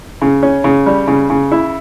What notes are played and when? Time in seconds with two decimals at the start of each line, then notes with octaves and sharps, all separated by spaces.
0.22 C#3
0.43 C#4
0.64 C#3
0.86 G3
1.08 C#3
1.30 C#3
1.52 E4